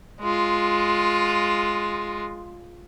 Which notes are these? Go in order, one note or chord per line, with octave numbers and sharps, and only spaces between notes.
G#3 F4